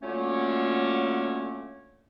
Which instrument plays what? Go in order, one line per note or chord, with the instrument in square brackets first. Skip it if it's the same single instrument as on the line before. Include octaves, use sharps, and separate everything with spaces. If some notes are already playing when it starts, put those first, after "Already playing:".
[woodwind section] D3 F#3 A3 A#3 C#4 F4